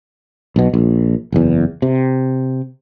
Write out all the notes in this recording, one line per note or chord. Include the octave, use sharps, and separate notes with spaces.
B1 B2
A#1
F#1 E2
C3